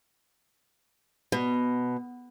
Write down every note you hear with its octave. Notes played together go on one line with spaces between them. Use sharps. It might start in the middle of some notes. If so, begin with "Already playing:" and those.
B2